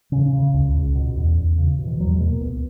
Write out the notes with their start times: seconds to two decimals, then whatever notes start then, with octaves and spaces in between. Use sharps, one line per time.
0.12 C#3 C#4
0.33 C#3
0.54 C#2
0.74 C#2
0.95 B2
1.16 E2
1.37 E2
1.58 C#3
1.78 B2
1.87 E3
2.00 E2 F#3
2.14 G#3
2.20 B2
2.28 A#3
2.41 C#2 B3